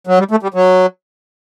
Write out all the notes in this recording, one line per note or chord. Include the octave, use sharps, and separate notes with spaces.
F#3
G3
A3
G3
F#3